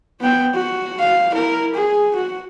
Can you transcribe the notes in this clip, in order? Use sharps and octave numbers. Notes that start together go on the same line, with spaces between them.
B3 G5
F#4
F5
E4 A#4
G#4
F#4